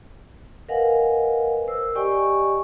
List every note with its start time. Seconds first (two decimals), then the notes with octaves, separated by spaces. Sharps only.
0.69 A#4 B4 D#5 F5 F#5 G#5
1.68 A#4 C5 E6
1.95 G4 D5 D#5 G5 G#5 C#6